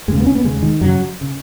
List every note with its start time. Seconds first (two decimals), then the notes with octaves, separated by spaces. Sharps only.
0.08 D#2 C#3 G#3
0.20 B3
0.27 C#4
0.35 B3
0.44 D#2 C#3 G#3
0.63 D#3
0.81 F#2 C#3 F#3
1.21 C#3